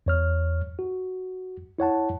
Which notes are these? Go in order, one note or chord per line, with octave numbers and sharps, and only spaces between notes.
E2 C#5 F6
F#4
E4 C#5 F#5 A5